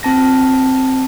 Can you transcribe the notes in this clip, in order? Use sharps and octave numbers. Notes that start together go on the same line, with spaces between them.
C4 A5 A#6